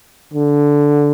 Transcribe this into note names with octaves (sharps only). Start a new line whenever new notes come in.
D3